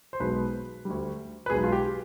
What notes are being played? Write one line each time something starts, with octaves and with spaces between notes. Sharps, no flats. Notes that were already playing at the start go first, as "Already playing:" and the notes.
C5
B1 B2 G#3 B3 B4
D2 D3 G3
B4
B1 B2 G#3 G#4
F4
G4